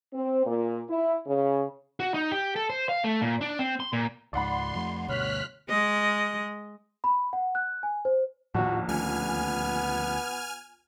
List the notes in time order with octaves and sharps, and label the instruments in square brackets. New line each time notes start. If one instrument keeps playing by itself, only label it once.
[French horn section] C4
A#2
E4
C#3
[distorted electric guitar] F#4
D#4
G4
A4
C5
F5
A3
A#2
D4
C4
C6
A#2
[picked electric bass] C#2 G#2 [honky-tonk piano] D5 F#5 B5 [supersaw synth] C6
[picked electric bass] F2 F3 A3
[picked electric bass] D2 G2 B2 [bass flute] C#5 [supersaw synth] F6 F#6 B6
[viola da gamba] G#3 D#5
[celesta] B5
F#5
F#6
G#5
C5
[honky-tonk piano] A#1 D#2 [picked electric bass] A2 [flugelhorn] F#4
[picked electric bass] D2 A3 C#4 [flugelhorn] B3 [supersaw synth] G#5 F6